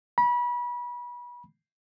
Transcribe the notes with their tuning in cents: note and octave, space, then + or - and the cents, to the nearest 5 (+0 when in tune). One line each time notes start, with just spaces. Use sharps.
B5 -30